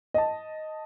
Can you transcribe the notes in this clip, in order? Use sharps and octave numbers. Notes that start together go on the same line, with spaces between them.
D#5 A5